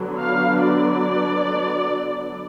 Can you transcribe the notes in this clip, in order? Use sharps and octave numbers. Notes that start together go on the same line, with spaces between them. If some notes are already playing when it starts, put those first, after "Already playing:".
Already playing: D3 F#3 B3 D4
F5
D5